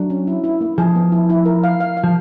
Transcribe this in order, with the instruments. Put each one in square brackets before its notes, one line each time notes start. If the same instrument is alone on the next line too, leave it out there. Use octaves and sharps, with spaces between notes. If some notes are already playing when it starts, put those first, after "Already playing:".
Already playing: [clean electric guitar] F#3 [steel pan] D4
[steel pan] C#4
E4
E4
A#3
[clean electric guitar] F3 [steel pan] G#4
[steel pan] B3
E4
E4
A#4
F5
F5
F5
[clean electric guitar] F3